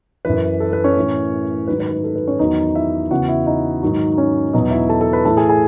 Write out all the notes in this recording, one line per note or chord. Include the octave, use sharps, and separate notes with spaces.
F#2 E3 B4
A4
B4
C#4 C#5
A2 E3
G#2 D#3 F#3 B4
B4
B4
A4
B4
C#4 C#5
E2 D#3 F#3 D#4 D#5
E4 E5
E2 C#3 E3 F#4 F#5
E4 E5
D#4 D#5
G#2 D#3 F#3
C#4 C#5
E2 B2 F#3 D#4 D#5
E4 E5
A4 A5
A4 A5
B4 B5
A2 E3 A4 A5
G#4 G#5
G#4 G#5